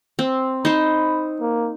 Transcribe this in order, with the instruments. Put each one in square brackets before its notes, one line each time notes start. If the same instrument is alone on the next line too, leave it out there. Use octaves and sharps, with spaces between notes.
[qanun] C4
[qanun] D#4 C5 [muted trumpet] B5
[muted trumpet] A#3